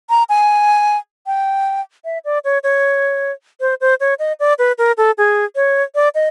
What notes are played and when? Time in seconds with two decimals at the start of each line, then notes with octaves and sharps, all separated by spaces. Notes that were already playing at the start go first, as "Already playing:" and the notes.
0.10 A#5
0.29 G#5
1.27 G5
2.05 E5
2.25 D5
2.45 C#5
2.64 C#5
3.61 C5
3.81 C5
4.00 C#5
4.19 D#5
4.40 D5
4.59 B4
4.78 A#4
4.98 A4
5.18 G#4
5.56 C#5
5.95 D5
6.15 D#5